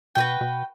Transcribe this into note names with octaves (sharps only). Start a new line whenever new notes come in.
B2 F#4 B4 D#5 G5
B2